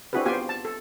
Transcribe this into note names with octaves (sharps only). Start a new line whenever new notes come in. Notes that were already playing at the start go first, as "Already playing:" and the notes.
C4 D4 E4 F#4 G#4 B4
B3 F4 G4 C5 G#5
A5
A4